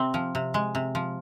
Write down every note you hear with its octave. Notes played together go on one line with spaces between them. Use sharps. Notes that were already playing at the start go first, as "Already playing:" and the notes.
Already playing: C3 C4
F3
C3
G#3
C3
F3